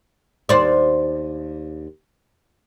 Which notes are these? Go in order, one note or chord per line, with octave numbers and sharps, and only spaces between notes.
D#2 C5 D5